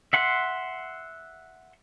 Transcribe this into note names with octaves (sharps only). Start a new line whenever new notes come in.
E5 F#5 C6